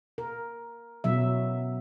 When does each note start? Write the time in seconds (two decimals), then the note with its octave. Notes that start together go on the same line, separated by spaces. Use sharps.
0.18 A#4
1.04 B2 F#3 E5